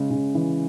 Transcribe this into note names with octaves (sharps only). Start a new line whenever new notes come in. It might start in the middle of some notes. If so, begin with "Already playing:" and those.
Already playing: C#3 G#3
C#3
E3